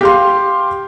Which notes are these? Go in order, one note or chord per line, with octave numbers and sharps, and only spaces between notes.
G4 F5 C6